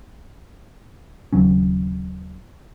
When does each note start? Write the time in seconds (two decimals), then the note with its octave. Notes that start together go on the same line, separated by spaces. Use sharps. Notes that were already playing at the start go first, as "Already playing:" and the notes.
1.33 D#1 C#3 F#3 C#4